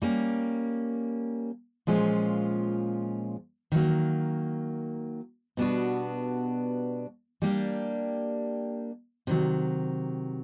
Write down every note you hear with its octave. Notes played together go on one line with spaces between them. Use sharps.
G3 A#3 C#4
A#2 F3 G#3 C#4 F4
D#3 F#3 A#3
B2 G3 B3 D4 F#4
G3 A#3 D4 G4
C3 D#3 F#3